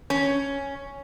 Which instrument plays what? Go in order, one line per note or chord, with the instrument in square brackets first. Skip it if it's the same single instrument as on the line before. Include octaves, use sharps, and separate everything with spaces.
[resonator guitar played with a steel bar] C#4